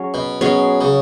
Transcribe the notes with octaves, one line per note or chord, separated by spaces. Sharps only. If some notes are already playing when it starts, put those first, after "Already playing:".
Already playing: F#3 C#4 G#4
B2
B2 F#3 C#4 G#4
C#3